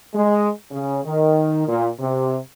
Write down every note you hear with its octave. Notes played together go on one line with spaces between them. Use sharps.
G#3
C#3
D#3
A#2
C3